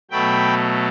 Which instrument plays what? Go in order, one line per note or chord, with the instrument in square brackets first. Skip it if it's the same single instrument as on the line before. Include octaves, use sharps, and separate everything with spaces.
[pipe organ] B2 F#3 A3 G5 B5